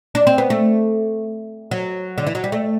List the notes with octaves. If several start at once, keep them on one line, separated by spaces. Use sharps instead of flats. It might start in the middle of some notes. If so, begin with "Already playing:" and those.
D4
C4
B3
A3
F#3
D3
E3
F#3
G3
A3